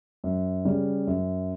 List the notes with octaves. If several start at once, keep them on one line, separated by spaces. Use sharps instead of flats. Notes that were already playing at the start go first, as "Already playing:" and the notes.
F#2
C#3 G3
F#2